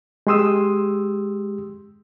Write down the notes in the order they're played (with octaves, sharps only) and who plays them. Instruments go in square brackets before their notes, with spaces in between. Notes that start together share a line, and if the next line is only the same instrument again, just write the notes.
[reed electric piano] G#3 G4 C6 D#6 E6